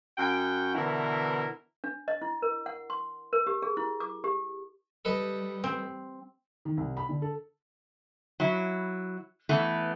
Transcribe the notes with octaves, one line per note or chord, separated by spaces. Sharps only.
F#2 F#4 F#5 G5
B2 D3 E3 E4 A#4
D4
D#5
E4
A#4
F#5
C6
A#4
G4
G#4
E4
D6
G4
G3 A4 B4 D#5
C4
D#3
C2
B5
D3
A4
F#3 E4
E3 A3 B3